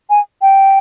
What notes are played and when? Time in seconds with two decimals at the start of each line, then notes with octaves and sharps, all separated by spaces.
0.10 G#5
0.42 G5